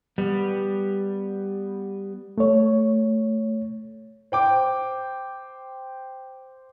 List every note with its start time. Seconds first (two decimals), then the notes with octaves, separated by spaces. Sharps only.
0.18 G3 B3
2.38 A3 C#5
4.32 C5 G5 D6